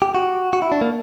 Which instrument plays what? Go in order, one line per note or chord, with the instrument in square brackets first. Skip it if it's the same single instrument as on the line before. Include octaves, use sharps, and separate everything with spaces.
[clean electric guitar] G4
F#4
F#4
E4
D4
A#3